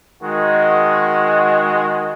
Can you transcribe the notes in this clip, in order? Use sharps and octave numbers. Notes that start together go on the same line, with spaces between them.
D#3 G#3 F#4